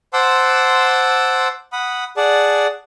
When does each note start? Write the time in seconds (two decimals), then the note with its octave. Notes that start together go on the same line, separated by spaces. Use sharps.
0.13 C5 F#5 A5 C6 D6 E6
1.72 F#5 B5 D#6
2.17 G#4 D5 F#5 A5